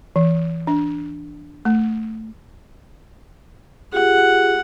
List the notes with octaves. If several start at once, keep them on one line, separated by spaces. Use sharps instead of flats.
E3
D4
A3
F4 G4 G#4 F#5